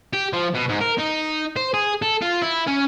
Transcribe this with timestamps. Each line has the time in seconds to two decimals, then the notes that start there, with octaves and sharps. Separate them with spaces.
0.13 G4
0.33 F3
0.54 B2
0.69 G#2
0.81 A#4
0.99 D#4
1.56 C5
1.74 G#4
2.02 A4
2.22 F4
2.42 E4
2.67 C#4